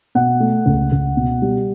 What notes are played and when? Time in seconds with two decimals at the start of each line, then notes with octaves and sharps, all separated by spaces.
0.15 B2 F#5
0.40 A3
0.66 C#2
0.92 C#2
1.17 B2
1.42 G3